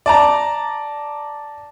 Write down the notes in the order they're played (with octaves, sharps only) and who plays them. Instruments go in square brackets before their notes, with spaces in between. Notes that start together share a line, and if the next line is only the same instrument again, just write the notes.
[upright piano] D5 A5 A#5